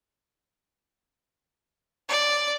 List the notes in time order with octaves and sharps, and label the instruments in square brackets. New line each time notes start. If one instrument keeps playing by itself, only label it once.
[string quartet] D5